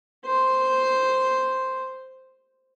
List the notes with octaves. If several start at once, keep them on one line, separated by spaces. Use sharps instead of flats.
C5 C6